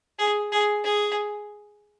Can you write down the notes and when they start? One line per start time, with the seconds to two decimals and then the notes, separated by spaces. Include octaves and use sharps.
0.19 G#4
0.52 G#4
0.84 G#4